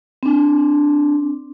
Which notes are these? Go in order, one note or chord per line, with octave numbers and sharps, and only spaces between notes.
C4 D4